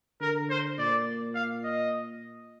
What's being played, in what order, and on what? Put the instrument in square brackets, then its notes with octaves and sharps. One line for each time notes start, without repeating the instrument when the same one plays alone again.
[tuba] D3 [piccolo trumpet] A#4
[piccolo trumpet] C5
[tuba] A#2 [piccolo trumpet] D5
[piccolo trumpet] F5
D#5